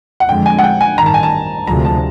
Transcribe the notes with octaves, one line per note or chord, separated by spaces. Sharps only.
F#5
F2 D3 F3 G#3 G5
G#5
F#5
G5
G#5
A1 G2 D#3 A#5
A5
G#5
A5
D2 C3 F3 G#3 A#5
A5